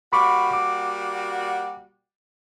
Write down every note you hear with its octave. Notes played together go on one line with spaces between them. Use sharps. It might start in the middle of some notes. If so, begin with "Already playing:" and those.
G3 A#3 F#4 B5 C#6 D6
D6